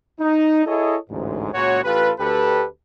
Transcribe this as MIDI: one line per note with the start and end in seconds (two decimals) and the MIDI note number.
0.20 0.66 63
0.66 0.96 64
0.66 0.96 68
0.66 0.96 69
0.66 0.96 73
0.66 0.96 75
1.10 1.49 33
1.10 1.49 38
1.10 1.49 44
1.53 1.83 37
1.53 1.83 46
1.53 1.83 66
1.53 1.83 73
1.84 2.10 33
1.84 2.10 65
1.84 2.10 67
1.84 2.10 69
1.84 2.10 71
2.19 2.65 38
2.19 2.65 67
2.19 2.65 69
2.19 2.65 71